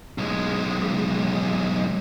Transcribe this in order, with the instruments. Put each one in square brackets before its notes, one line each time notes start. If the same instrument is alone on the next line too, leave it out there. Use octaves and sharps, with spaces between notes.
[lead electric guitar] B1 G#3